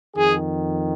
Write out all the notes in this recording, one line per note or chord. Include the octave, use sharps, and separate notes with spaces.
F2 D#3 G#4